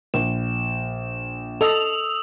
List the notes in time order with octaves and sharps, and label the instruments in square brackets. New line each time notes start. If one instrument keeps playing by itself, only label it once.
[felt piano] A#1 [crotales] E7
[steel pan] A4 D#5 [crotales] D#6 E6 F7